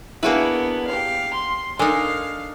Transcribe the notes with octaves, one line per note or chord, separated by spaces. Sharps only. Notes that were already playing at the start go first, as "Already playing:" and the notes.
A#3 B3 D4 E4 F#4 G#4 B4
G4 F5
C6
D4 D#4 A4 A#4 F5 G#5